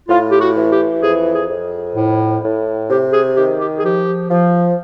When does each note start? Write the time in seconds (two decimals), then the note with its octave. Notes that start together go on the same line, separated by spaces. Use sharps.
0.09 A2 F4
0.31 G4
0.40 F#4
0.56 E3
0.71 G4
1.02 F2 G#4
1.34 G#4
1.50 F2
1.95 A2
2.43 A2
2.90 C3 G4
3.13 G#4
3.36 D#3 G4
3.60 G4
3.78 G#4
3.83 F3 G4
4.30 F3